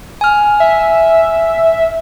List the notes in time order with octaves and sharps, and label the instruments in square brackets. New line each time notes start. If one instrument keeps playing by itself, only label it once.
[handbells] G#5 F6
[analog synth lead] E5